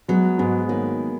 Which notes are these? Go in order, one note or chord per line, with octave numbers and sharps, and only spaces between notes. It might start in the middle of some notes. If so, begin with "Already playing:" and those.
F#3 G#3 B3
G#2 G#3 B3
D#3 F#3 A#3